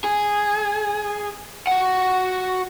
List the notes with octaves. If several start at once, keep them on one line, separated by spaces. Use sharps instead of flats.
G#4
F#4 F#5